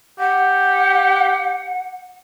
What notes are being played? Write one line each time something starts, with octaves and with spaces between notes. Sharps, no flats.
G4 F#5